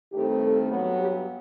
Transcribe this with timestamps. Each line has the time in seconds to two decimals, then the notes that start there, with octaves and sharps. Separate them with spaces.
0.12 G2 D#3 A3 C4 G4
0.41 A4
0.70 G2 F#3 B3
0.98 G4